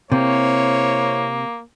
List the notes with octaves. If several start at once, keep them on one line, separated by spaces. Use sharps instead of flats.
C3 A#3 E4 C5 C#5